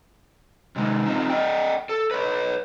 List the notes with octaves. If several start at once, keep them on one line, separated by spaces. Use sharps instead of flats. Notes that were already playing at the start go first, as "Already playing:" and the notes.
C3 D#3 G#3
C4 D#4 F4
D5 D#5 G5
A4
B4 C#5